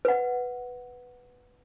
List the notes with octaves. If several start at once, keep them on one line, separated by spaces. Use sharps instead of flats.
B4 F#5